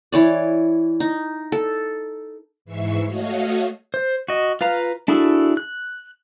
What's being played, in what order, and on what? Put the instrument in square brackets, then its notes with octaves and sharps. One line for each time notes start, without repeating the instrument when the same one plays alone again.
[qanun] E3 C#5 D5
D#4
A4
[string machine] G#2 E3 E5 C#6 C7
A3 F#4 C#5 D#5 F5
[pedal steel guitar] C5
F#4 D#5
F4 B4 F5 A#5
D4 E4 F#4 G#4 A4
F#6